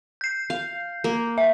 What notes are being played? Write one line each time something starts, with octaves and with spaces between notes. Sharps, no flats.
G6 C7
F5
A#3
E5